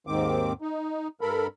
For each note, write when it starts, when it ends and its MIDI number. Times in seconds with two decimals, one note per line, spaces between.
0.07 0.53 39
0.07 0.53 44
0.07 0.53 51
0.07 0.53 60
0.07 0.53 86
0.62 1.08 63
1.21 1.47 43
1.21 1.47 69
1.21 1.47 70
1.21 1.47 83